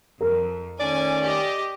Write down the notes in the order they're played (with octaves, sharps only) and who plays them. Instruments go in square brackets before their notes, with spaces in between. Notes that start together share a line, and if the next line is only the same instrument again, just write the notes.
[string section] F2 [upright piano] A#4
[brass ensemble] D#3 A3 C#4 [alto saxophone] D5 [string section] G#5
[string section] G4 D#5